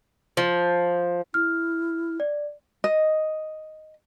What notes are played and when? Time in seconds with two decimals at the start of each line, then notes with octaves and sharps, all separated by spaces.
0.37 F3
1.34 E4 F6
2.20 D5
2.84 D#5